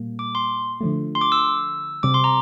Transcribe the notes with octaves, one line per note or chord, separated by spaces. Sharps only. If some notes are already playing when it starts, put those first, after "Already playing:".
Already playing: A#2 G3 A#3
D6
C6
D3 F3 A3
C6
D6
E6
C3 G3 C4 D6
C6
A#5